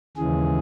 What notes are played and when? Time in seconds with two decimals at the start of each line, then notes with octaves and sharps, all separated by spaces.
0.17 D#2 C#3 E3 G#3 G#4